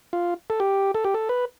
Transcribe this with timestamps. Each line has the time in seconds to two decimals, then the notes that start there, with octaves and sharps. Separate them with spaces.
0.13 F4
0.50 A4
0.60 G4
0.95 A4
1.04 G4
1.14 A4
1.29 B4